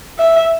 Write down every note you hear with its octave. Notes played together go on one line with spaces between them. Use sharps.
E5